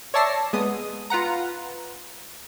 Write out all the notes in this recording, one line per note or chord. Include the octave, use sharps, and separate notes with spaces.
C#5 D5 E5 A5 A#6 C7
G#3 B3 D#6
F4 B4 F#5 A#5